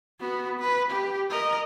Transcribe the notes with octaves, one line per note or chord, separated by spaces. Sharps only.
B3 F#4
B4
G4
A#4 D#5